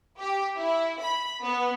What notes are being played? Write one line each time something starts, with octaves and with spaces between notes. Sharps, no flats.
G4
E4
B5
B3